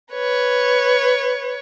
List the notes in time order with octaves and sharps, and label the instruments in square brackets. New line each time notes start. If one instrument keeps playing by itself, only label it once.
[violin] B4 C#5